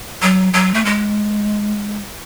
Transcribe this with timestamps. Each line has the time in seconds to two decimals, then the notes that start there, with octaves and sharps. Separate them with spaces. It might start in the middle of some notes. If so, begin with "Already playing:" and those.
0.22 F#3
0.53 F#3
0.74 A3
0.85 G#3